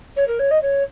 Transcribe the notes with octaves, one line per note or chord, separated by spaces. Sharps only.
C#5
A#4
C#5
D#5
C#5